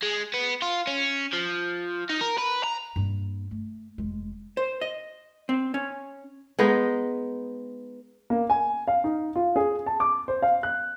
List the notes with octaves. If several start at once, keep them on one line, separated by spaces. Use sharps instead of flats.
G#3
B3
F4
C#4
F3
D#4
A#4
B4
A#5
G2 A#3
A3
F1 G#3
C5
D#5
C4
C#4
G#3 B3 D#4
A#3
G#5
F5
D#4
F4
G#4
A5
D6
C5
F5
F#6